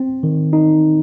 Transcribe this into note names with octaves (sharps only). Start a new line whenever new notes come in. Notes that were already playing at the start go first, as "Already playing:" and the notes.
Already playing: C4
D#3
D#4